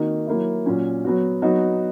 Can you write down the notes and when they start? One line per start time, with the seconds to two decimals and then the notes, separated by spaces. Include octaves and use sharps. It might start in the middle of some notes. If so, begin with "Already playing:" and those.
Already playing: D#3 A#3 D#4 F#4
0.27 F#3 A#3 E4
0.66 A#2 F#3 C#4
1.05 F#3 B3 F#4
1.42 F#3 B3 D#4 F#4